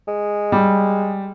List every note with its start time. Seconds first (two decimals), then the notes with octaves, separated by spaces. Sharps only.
0.08 G#3
0.52 G3